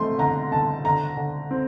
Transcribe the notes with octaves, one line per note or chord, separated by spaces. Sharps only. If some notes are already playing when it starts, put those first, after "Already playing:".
Already playing: A3 C4 C6
D3 A#5
D3 A5
D3 A#5
D3
C4